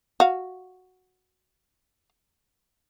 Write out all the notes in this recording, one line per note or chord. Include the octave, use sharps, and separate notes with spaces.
F#4 F5